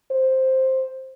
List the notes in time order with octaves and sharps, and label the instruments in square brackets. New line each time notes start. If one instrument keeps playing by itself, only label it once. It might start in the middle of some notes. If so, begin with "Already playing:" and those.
[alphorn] C5